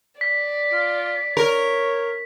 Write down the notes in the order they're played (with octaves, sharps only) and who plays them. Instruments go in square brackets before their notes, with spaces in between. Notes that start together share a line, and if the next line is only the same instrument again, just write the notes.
[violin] D5 [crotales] B6
[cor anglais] F4
[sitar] A#4 [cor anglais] C#5